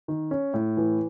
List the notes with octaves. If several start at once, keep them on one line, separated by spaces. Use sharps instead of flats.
D#3
C#4
A2
E3